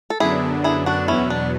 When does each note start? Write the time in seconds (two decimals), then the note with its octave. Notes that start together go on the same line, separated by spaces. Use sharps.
0.10 A4
0.20 F#2 D3 F#3 B3 D4 E4 G#4
0.64 E4 G#4
0.86 D4 F#4
1.08 E2 B2 F#3 B3 C#4 E4
1.30 D4